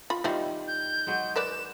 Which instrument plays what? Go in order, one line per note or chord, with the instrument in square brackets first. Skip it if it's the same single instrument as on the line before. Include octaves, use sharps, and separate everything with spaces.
[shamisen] F4 B5
[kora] D#3 G3 [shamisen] C4 E4 F4
[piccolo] G6
[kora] F#3 G#3
[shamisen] A#4 B4 D5 [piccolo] E7